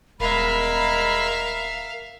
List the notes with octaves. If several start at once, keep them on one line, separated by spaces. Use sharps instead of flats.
D#1 E2 G#3 A#4 E5 F5 B5